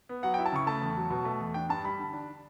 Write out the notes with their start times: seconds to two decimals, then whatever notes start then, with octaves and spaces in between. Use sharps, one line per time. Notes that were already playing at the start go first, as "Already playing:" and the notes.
0.09 B3
0.23 F#3 F#5
0.34 G5
0.38 E4
0.46 A5
0.52 C#3 C#6
0.67 A3 A5
0.81 E2
0.97 F#3
1.10 B2
1.25 A3
1.40 E2
1.54 D4 G5
1.69 G2 A5
1.84 G3 B5
1.99 D3
2.13 D4